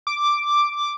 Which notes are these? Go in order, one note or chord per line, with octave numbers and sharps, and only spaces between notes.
D6